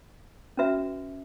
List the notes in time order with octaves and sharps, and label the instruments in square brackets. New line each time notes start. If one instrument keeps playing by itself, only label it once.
[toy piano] C#4 F#4 B4 E5